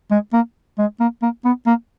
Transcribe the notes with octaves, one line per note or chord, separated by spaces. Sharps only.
G#3
A#3
G#3
A#3
A#3
B3
A#3